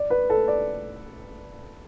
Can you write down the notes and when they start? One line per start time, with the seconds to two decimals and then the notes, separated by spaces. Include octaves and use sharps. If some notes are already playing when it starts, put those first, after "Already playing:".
Already playing: D5
0.10 B4
0.30 A4
0.48 D5